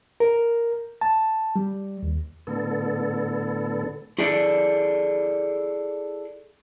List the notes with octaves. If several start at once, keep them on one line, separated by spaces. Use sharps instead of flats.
A#4
A5
G3
D#2
A2 D3 B3 A4
E4 G#4 A4 D5